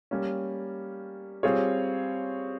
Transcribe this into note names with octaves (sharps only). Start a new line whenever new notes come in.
G3 A#3 C#4
G3 C4 F4 G#4 C#5